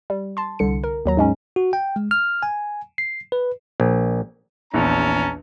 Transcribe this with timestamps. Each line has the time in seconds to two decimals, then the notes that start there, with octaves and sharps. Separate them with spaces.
0.10 G3
0.37 A5 C6
0.59 C2 D3 C#7
0.84 A#4
1.06 D#2 F#3 A#5
1.17 G#2 G#3 C#4
1.56 F#4
1.73 G5
1.96 G#3
2.11 F6
2.43 G#5
2.98 C7
3.32 B4
3.80 A#1
4.74 A#1 E2 C#4 A5 A#5